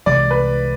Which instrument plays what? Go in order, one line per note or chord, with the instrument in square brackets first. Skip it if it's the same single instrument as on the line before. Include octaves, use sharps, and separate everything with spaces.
[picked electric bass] C2 C3 E3 G#3 [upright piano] D5
[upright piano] B4